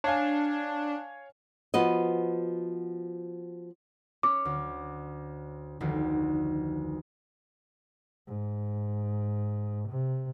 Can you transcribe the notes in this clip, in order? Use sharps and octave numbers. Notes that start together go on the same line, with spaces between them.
D4 C#5 F5 G#5
F3 B3 F#4 D#5
C#4 C#5 D6
D2
F1 D2 D#3
G#2
C3